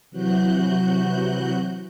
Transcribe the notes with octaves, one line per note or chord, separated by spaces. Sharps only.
C3 E3 F#3 F#4 F#6 G6